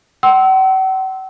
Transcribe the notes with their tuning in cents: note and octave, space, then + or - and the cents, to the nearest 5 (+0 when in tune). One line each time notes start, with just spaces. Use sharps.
F#5 +45 C6 +0 E6 -20